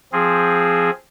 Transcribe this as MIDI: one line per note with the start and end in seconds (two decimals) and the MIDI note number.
0.13 0.90 53
0.13 0.90 60
0.13 0.90 68